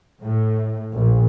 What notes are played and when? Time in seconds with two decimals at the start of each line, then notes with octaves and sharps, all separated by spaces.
0.22 A2
0.94 A#1